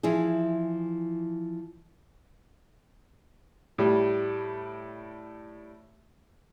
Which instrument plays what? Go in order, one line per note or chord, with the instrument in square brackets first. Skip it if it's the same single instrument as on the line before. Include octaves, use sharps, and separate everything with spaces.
[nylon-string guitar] E3 F3 E4 G#4
[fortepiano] A2 G3